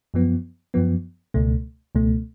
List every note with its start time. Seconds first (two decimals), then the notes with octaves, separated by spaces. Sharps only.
0.14 F#2 F3 B3
0.74 F#2 F3 B3
1.34 C#2 B2 A3
1.95 C#2 B2 A3